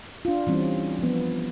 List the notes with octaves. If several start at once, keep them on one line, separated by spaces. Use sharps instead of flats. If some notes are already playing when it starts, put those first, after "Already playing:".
D4 F4
E3 G3 C4 C#4
F3 B3